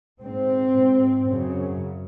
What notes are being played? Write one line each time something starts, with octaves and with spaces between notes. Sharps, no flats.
G#2 C4
G#2
F#2 C#3